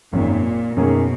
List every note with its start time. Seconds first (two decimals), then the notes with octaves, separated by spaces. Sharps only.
0.13 G#1 F#2 A#2 D#3
0.77 F#2 B2 D#3 A#3 C#4 G#4